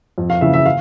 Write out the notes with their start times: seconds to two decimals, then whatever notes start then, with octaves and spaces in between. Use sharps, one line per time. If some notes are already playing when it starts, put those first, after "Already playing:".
0.18 F2
0.30 F5
0.41 C#3 E3 E5
0.53 E5
0.66 F5